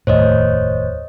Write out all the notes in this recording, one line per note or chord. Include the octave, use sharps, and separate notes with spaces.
F1 D#2 A2 C5 C#5 D#5